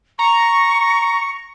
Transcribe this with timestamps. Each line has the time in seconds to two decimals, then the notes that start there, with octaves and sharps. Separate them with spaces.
0.19 A#5 C#6